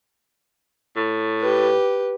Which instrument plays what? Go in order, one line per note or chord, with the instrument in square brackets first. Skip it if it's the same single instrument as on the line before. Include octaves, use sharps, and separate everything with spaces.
[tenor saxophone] A2
[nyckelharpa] G4 B4